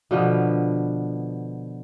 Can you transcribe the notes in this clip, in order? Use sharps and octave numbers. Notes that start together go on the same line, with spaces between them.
B2 D3 F3 B3